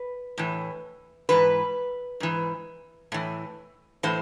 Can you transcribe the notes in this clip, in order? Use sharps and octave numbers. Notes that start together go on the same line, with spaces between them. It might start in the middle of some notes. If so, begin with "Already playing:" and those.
Already playing: B4
A2 E3
G#2 E3 B4
G#2 E3
A2 E3
A2 E3 C5